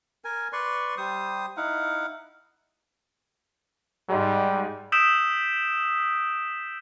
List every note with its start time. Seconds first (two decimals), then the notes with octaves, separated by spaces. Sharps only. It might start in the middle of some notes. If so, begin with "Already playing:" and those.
0.24 A#4 G#5
0.53 B4 D5 C6 C#6
0.97 G3 C5 D#6
1.57 D#4 E4 F5 F#5
4.09 G#2 G3 G#3
4.92 D#6 E6 G6 B6 D7 E7